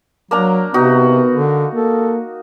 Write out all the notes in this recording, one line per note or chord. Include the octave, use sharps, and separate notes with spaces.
F#3 A#3 D4 A#5
C3 B3 D#4 F#4
D3
A#3 A4